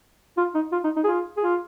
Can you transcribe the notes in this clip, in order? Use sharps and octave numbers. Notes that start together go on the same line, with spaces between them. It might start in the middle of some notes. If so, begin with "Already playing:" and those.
F4
D#4
F4
D#4
D#4
G#4
F4
G#4
F4